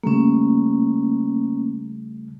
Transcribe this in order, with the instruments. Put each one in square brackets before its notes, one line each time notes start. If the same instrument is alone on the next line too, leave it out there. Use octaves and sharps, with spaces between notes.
[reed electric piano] C#3 G3 A3 [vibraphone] A#3 C#4